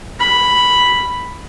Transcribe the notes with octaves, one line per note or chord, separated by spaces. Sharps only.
B5